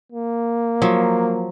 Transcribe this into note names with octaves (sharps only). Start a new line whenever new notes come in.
A#3
F3 F#3